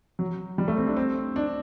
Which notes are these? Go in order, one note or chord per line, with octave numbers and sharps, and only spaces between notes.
F#3
G3
A3
C4
D4
C4
D4